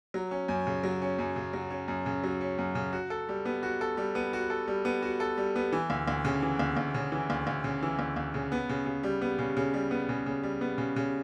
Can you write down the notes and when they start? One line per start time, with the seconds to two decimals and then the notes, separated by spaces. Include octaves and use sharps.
0.14 F#3
0.31 C#4
0.48 F#2
0.67 C#3
0.83 F#3
1.02 C#4
1.19 F#2
1.36 C#3
1.53 F#3
1.70 C#4
1.88 F#2
2.06 C#3
2.24 F#3
2.41 C#4
2.58 F#2
2.75 C#3
2.93 F#4
3.10 A4
3.29 G3
3.45 B3
3.63 F#4
3.81 A4
3.97 G3
4.15 B3
4.33 F#4
4.50 A4
4.68 G3
4.85 B3
5.02 F#4
5.20 A4
5.38 G3
5.56 B3
5.72 E3
5.90 D2
6.08 D2
6.25 C#3
6.42 E3
6.59 D2
6.77 D2
6.95 C#3
7.12 E3
7.30 D2
7.47 D2
7.64 C#3
7.82 E3
7.99 D2
8.16 D2
8.34 C#3
8.52 B3
8.69 C#3
8.86 C#3
9.03 G3
9.21 B3
9.39 C#3
9.57 C#3
9.74 G3
9.91 B3
10.09 C#3
10.26 C#3
10.43 G3
10.61 B3
10.78 C#3
10.96 C#3